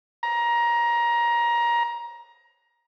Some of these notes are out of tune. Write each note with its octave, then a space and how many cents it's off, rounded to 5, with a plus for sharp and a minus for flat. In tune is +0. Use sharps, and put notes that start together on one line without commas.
A#5 +20